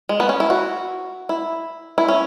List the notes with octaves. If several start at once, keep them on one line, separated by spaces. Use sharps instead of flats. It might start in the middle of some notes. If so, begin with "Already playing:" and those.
G#3
B3
C#4
E4
F#4
E4
E4
C#4